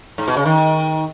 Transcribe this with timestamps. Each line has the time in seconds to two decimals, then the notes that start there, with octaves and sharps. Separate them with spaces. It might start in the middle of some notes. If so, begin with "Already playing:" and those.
0.18 G#2
0.28 B2
0.37 C#3
0.46 D#3